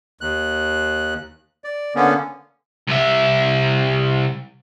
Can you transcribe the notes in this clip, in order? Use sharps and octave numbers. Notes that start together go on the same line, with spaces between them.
D#2 F#6
D5
D3 A#3 B3 C#4
C2 E5